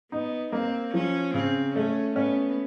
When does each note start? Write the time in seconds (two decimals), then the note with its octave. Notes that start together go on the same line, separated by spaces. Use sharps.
0.12 B3 D#4
0.52 A#3 C4
0.94 F3 C#4
1.34 C#3 C4
1.75 A3 C#4
2.16 B3 C#4